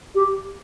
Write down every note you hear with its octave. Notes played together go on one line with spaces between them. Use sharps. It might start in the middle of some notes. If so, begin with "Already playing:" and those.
G4